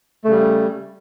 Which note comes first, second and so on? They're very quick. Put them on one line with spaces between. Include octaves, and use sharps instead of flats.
A3 C#3 G3